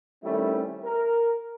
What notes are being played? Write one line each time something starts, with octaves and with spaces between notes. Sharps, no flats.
D#3 G3 A3 C4 C#4 E4
A#4